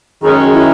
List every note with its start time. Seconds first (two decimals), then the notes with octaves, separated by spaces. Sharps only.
0.22 F#2 D#3 G#3 C#4 G#4
0.53 E4